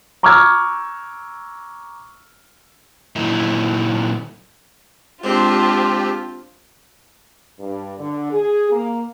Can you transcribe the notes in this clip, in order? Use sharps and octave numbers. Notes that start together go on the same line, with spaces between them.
A#5 C#6 D6 E6 F6 G#6
A#2 D#3 F#3 D#4 E4
G#2 C4 D4 F4 G4
G2
D3
G#4
A#3